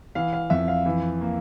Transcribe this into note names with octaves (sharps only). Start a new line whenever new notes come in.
E3 F5
F5
F2 E5
F5
E3
A#3